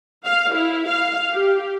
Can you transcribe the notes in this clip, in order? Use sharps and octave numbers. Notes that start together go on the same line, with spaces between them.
F5
E4
F5
G4